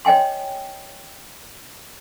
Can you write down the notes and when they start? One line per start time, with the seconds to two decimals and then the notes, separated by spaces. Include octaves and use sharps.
0.05 C#5 D#5 G5 G#5 C6